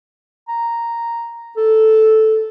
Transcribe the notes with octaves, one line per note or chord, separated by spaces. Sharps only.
A#5
A4